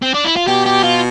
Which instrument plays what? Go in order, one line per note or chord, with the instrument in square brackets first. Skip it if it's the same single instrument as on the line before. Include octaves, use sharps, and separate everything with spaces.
[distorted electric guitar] C4
D4
E4
F4
[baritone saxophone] B2 [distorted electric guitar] G4
[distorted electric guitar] G4
F4